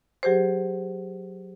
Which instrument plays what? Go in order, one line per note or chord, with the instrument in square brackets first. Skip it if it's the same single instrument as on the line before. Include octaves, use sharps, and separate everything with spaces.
[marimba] F#3 G4 G#4 C5